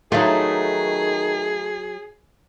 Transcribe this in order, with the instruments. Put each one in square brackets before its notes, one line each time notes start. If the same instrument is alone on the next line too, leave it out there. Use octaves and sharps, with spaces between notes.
[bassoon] D#3 [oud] F#3 F4 [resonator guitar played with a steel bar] A3 B3 D#4 [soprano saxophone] G#4